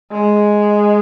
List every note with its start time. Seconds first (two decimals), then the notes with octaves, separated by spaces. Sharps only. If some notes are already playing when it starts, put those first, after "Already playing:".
0.12 G#3